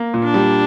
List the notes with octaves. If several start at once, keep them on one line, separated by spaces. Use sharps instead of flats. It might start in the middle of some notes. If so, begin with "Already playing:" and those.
Already playing: A#3
A#2
D4
G3